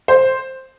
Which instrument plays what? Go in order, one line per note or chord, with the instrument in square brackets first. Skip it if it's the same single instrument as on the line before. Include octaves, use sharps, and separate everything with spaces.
[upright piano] C5